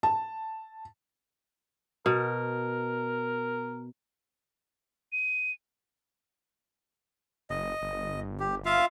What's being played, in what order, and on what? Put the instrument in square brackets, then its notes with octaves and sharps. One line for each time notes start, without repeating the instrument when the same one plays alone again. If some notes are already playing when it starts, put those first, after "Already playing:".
[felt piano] A5
[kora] B2 [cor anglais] A#4
[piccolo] D#7
[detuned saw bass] F#1 [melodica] D#5
[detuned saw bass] G1
[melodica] G4
F4 E5 F5